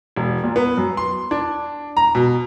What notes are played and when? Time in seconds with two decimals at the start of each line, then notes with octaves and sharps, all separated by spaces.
0.16 E1
0.44 A#2
0.56 B3
0.77 F#2
0.97 C6
1.31 D4
1.97 A#5
2.15 B2